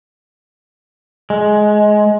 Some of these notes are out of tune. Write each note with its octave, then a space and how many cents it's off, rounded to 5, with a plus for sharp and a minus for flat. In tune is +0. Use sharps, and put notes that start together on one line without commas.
G#3 +15